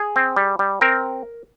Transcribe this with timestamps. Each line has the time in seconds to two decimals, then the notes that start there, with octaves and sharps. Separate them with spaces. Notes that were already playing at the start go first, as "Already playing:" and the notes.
Already playing: G#4
0.16 C4
0.36 G3
0.59 G3
0.81 C4 A#4